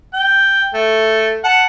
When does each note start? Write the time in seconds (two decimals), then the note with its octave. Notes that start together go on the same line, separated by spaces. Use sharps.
0.14 G5
0.74 A3
1.44 F#5 A5